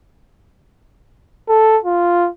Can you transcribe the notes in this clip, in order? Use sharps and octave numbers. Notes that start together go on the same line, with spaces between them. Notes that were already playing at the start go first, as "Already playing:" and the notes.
A4
F4